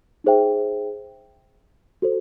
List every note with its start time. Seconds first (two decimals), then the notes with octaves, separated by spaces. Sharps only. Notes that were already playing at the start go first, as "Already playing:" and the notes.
0.24 D#4 G#4 C5 E5 G5
2.02 F#4 A4 C5